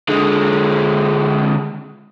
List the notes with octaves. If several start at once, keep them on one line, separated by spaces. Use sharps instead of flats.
D3 G#3